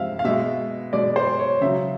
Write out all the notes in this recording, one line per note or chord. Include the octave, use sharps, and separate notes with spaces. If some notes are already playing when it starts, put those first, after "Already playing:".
Already playing: C3 F3 G#3 E5 F5
F5
B2 G#3 E5
B2 G#3 D5
C5
C#5
C#3 F#3 E5